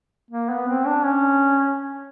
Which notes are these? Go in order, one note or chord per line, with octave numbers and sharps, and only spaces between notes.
A#3
B3
C4
D4
C#4